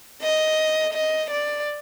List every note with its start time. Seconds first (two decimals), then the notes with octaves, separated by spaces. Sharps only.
0.21 D#5
0.94 D#5
1.30 D5